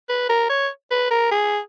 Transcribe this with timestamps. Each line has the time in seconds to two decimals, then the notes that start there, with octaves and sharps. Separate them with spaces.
0.09 B4
0.29 A#4
0.49 C#5
0.91 B4
1.11 A#4
1.31 G#4